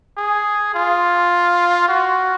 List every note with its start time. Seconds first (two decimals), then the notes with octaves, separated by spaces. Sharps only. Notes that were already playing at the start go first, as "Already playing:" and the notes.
0.17 G#4
0.75 F4
1.89 F#4